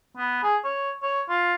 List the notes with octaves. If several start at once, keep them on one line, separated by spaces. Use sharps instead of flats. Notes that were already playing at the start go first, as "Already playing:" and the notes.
B3
G#4
C#5
C#5
F4